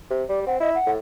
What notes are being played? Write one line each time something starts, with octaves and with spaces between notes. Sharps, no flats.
C3
G3 D5
C4 F#5
E4 D#5
F#5
A2